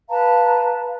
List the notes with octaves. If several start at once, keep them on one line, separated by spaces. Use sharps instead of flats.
B4 F5 A5 A#5